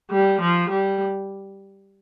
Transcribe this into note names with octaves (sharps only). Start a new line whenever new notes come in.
G3
F3
G3